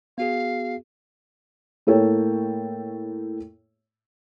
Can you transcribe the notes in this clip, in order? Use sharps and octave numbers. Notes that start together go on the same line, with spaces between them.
B3 F#4 G#4 F5
A2 A#3 A4 C#5 G5